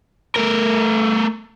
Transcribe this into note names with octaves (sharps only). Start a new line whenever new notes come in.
A3 A#4